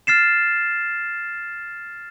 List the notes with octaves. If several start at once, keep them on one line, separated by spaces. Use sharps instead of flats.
F6 A6 C7 E7